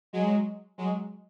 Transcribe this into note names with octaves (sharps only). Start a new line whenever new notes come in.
F#3 G#3
F#3 G#3